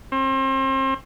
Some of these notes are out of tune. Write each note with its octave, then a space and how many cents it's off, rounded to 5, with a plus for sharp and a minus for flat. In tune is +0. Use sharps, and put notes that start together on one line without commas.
C4 +35